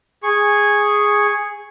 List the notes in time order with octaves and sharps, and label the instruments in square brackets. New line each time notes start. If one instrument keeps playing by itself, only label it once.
[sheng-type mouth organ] G#4 C#6